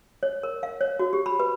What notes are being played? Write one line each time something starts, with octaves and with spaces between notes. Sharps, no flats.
C#5
A#4
F5
C#5
F#4
G4
B5
B4